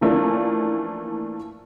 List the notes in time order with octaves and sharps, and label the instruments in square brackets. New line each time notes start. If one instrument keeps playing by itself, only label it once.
[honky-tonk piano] E3 F3 A3 A#3 C#4 D4